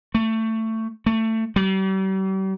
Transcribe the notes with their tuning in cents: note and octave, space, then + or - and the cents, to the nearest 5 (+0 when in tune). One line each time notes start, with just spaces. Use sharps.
A3 +20
A3 +20
G3 -40